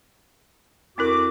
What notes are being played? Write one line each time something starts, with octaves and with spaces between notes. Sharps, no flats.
F2 C4 E4 F#4 A#4 D6